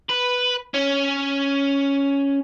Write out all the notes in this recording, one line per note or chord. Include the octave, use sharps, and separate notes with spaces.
B4
C#4